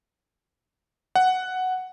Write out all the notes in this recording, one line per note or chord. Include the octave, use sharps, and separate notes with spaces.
F#5